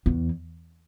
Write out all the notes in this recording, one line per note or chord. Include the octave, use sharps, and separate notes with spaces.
E2